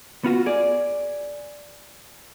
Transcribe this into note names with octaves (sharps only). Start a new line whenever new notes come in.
B3 F4 F#4
G#4 D5